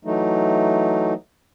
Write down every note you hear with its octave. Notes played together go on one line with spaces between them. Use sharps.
E3 F#3 A3 D#4